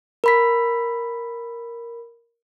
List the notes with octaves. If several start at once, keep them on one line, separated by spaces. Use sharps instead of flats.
A#4 B5 B6